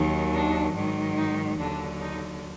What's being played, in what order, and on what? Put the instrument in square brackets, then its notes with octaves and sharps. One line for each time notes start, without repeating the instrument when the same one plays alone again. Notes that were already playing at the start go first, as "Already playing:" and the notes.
Already playing: [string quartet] D#2 D#3 F#3
D4
G#2 D#3 F#3
D#4
D#2 D3 F#3 D4
D#4